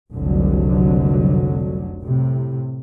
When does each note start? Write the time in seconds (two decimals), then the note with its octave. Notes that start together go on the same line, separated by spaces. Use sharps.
0.12 F1 C2 D3 F#3
2.00 A2 C3